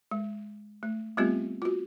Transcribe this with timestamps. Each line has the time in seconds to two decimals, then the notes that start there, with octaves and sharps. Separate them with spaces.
0.11 G#3
0.83 A3
1.17 G3 A3 B3 C4 F4 G4
1.62 F4 F#4